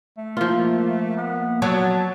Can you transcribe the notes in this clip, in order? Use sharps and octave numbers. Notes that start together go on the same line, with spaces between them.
A3
F3 A#3 F4
B3
F#3 B3 A5